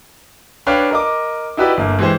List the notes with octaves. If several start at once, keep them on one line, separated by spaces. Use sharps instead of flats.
D4 B4 C#5 F5 G5
A#4 D#5 D6
D#4 E4 F#4 G4 B4 D5
G1 A#3
E3 G#3 G4 G#4 C5